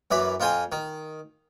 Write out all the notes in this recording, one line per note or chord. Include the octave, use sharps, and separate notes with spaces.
F#2 E3 D5 B5
F2 F4 C5 G5 G#5
D#3